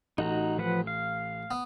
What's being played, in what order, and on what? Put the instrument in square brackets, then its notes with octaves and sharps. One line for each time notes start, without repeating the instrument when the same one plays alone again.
[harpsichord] A1 [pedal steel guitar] D#4 F#4 A#5
[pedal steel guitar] F3 B4 F#5
F5
[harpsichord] B3